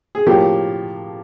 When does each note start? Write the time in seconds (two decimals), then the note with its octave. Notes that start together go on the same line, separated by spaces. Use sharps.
0.15 G#4
0.26 A2 F3 A#3 G4